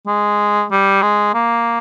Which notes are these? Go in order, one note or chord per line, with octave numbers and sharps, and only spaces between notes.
G#3
G3
G#3
A#3